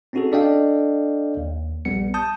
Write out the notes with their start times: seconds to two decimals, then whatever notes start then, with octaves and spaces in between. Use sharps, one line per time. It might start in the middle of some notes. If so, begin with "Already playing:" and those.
0.13 C4 C#4 D#4 F#4 G#4 A4
0.32 D4 A4 D5 D#5 F5 G5
1.37 D#2
1.85 A#1 G3 B3 C#7
2.14 A5 D#6 G6